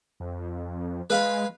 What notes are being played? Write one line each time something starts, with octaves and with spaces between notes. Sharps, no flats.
F2
G#3 B4 F5 B5